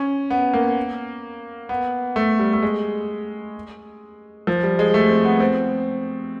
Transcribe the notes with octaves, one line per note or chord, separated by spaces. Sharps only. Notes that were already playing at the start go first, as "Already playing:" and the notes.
Already playing: C#4
B3
A#3
B3
A3
G3
A3
G#3
F3
G3
G#3
A3
C4
B3
C4